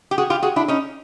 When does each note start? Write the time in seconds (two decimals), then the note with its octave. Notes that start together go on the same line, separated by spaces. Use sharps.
0.11 G4
0.18 F#4 G#4
0.30 F4 G4
0.43 F#4 G#4
0.56 D4 E4
0.68 C#4 D#4